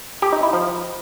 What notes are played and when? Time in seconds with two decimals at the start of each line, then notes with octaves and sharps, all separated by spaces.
0.22 G4
0.33 D#4
0.43 E4
0.53 F3